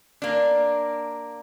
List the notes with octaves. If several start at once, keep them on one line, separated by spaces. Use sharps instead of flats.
A#3 D4